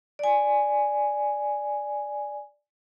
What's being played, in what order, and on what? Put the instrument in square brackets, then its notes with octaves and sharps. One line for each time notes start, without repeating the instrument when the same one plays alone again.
[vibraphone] D5 G#5